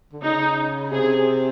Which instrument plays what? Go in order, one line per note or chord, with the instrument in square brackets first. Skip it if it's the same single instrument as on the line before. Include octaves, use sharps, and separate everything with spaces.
[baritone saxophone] D3
[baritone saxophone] C#3 [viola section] D#4
[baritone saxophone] C3 [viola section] G#4